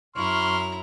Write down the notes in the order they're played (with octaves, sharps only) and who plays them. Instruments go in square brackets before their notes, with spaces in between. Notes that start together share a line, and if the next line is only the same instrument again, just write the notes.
[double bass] F#2 [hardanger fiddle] E4 A#5 [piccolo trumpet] C6 [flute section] C#6 F6